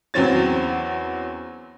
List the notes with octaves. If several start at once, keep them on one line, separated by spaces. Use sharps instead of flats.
E2 F#3 C4 C#4 A6